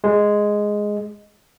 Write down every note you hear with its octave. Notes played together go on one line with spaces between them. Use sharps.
G#3